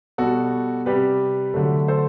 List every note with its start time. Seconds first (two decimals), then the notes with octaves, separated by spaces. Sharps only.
0.18 B2 G3 F#4 A4
0.86 C3 G3 G4 B4
1.54 D3 F#3 A3
1.88 A4 C5